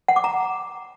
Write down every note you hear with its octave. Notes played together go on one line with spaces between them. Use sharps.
F#5
D6
A#5